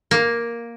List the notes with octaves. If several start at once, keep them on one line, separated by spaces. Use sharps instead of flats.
A#3